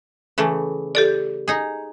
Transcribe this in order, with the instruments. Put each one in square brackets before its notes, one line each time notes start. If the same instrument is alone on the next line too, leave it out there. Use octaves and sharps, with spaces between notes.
[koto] C#3 E3 A3
[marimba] G4 A4 D5
[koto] D#4 G#4